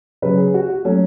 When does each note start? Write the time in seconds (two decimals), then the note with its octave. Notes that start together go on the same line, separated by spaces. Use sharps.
0.22 C#3 F#3 C#4 B4
0.37 G#4
0.54 F#4
0.70 F#4
0.85 F#3 A3 C#4 F#4